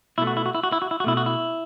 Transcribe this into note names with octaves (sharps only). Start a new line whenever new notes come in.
B2 A3 E4
F#4
E4
F#4
E4
F#4
E4
F#4
E4
F#4
B2 A3 E4
F#4
E4